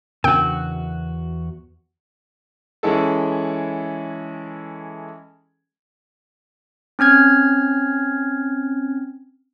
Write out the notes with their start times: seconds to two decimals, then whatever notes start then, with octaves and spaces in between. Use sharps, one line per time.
0.24 E2 C#3 B3 D4 F#4 A#4 G5
2.83 E3 G#3 C#4 E4 G#4 A4
6.99 C4 C#4 F6 G#6